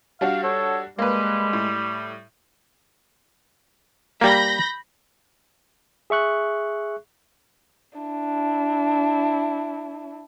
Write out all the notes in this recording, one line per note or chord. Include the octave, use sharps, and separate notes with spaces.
G3 D4 F#4 F5
A4 C#5
G3 G#3 A#3 B4
A2
G3 A#3 B5 G6 A#6
G#4 E5 C#6 F#6
D4 E4